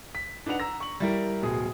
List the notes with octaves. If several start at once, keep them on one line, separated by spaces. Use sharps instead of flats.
B6
D4 D#4 B4 F#5 F7
A#5 E6 A#6
C#6 F#7
G3 E4 A#4
D1 B2 G#4 D#6